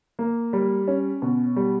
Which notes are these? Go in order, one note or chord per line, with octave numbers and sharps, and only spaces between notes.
A#3
G3
C#4
B2
G3